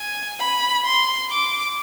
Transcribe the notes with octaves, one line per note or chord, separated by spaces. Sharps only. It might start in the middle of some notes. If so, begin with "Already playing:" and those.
Already playing: G#5
B5
C6
D6